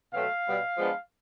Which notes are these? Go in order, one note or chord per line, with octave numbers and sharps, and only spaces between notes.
B2 F#3 A3 C4 F5
B2 G3 B3
F3 G#3 B3 D4